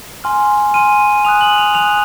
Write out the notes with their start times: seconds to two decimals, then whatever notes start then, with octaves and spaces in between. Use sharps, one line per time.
0.24 G#5 C6 F6
0.74 G#5 C6 F6 D#7
1.25 G#5 D#6 F#6 F7
1.41 F#7
1.58 F7
1.75 G#5 D#6 F#6 F7